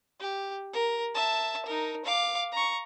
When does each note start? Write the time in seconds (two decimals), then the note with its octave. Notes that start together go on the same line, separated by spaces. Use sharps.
0.20 G4
0.73 A#4
1.14 E5 A5
1.66 D#4 A#4
2.05 F5 D6
2.52 A#5 C#6